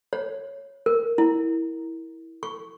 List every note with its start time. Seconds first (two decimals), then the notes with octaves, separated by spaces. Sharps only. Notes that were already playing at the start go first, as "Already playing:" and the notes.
0.13 C#5
0.86 A#4
1.18 E4
2.43 C#6